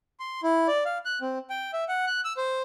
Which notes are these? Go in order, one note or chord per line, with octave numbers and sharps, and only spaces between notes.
C6
E4
D5
F5
F#6
C4
G5
E5
F#5
F#6
E6
C5